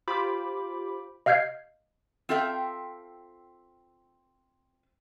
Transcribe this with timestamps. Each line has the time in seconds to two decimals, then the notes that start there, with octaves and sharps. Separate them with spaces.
0.08 F4 G4 C5 B5 D6
1.26 D#5 F5 F6 G6 G#6 C7
2.29 C4 F4 A4 E5 G5